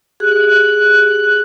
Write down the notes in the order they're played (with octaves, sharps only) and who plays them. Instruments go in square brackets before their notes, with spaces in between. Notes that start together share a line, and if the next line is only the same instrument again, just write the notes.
[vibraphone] G4 G#4 [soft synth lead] F#6